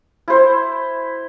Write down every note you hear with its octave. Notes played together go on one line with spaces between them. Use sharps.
E4 C5